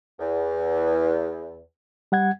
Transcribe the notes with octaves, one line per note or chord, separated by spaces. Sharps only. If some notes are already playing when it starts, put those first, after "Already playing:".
E2
G3 F#5 G#6